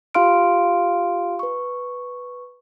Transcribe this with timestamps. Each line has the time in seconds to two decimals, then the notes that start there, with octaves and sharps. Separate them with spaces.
0.14 F4 G4 F5 C6 F6 D7
1.39 B4 C#6